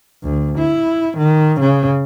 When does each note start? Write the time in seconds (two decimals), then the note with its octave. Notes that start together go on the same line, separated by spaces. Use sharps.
0.23 D2
0.58 E4
1.18 D#3
1.60 C#3